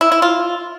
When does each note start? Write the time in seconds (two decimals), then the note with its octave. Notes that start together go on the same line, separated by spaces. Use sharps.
0.01 E4
0.12 E4
0.22 F4